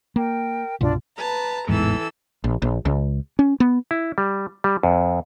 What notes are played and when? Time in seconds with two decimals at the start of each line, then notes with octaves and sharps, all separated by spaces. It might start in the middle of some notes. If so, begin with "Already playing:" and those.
0.16 A#3 A#4 G5
0.81 C2 G2 B2 D4 F4 D5
1.18 B4 A5 A#5
1.69 A1 E2 G#2 E3 A4 E6
2.44 A#1
2.62 A#1
2.85 C#2
3.39 C#4
3.60 B3
3.91 E4
4.18 G3
4.64 G3
4.83 F2